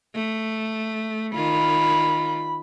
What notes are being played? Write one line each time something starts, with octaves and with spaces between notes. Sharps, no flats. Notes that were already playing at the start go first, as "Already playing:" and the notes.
A3
D#3 F4 B5